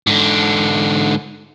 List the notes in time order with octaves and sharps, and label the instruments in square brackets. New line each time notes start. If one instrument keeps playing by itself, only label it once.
[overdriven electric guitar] G#2 D3